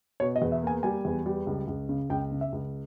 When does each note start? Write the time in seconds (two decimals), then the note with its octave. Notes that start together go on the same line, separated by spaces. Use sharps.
0.20 B2 C#5
0.36 D#5
0.42 E2
0.52 E5
0.63 A#3 G#5
0.83 G3 G#5
1.05 E2
1.26 G3
1.47 C#2
1.67 C#2
1.89 C#3
2.10 C#2 G5
2.31 C#3
2.41 E5
2.52 C#2